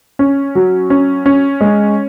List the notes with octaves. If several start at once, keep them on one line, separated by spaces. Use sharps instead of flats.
C#4
F#3
C#4
C#4
G#3